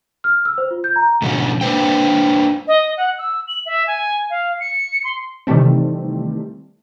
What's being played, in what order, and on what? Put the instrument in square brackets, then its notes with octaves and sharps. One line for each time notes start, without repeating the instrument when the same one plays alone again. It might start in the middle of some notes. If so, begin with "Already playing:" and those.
[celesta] F6
E6
C5
F4
G6
A#5
[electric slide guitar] G#2 B2 D3 F3 C#4
A#3 D4 B4 C5 G5
[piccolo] D#5
F#5
E6
F#7
E5
G#5
F5
C#7
C6
[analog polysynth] C3 D#3 E3 G3 A3 C4